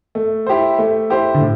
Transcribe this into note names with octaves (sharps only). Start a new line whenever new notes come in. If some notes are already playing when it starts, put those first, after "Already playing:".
A3
E4 G4 C5
A3
E4 G4 C5
D3
A2